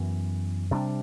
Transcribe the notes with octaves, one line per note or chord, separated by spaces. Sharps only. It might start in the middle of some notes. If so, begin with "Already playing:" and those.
Already playing: F#2 E3 B3
C3 G3 B3 D4